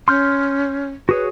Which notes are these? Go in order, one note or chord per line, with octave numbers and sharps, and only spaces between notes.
C#4 C6 F6 G6
F#4 G#4 B4 C#5